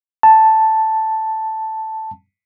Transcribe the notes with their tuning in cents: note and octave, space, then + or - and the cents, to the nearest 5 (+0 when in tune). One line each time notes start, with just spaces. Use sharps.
A5 +0